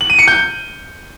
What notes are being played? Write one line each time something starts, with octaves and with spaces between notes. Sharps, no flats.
F#7
D#7
C#7
G6